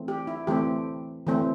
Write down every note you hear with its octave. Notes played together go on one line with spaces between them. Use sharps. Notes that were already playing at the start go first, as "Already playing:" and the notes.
Already playing: E3 A3 C4
G4
E4
E3 A3 C4 G4
E3 A3 C4